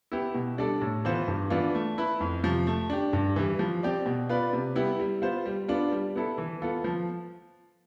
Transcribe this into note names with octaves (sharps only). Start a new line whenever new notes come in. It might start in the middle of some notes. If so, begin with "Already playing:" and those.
B3 E4 G4
B2
G3 D4 A4 D5
A2
E3 B3 F4 C5
G2
E3 B3 D4 F4
A3
E4 B4
F2
C3 F3
A3
D4 G4
G2
E3 G3
F3
C4 G4 D5
B2
B3 F4 B4 D5
C3
G3 B3 E4 G4
G3
B3 F4 C5
G3
B3 D4 F4
G3
B3 E4 A4
E3
B3 F4 A4
F3